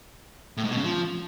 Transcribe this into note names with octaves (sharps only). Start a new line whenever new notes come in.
A2
G#2
B2
C#3
F3